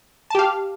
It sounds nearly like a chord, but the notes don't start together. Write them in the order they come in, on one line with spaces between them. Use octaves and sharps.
A5 G4 F5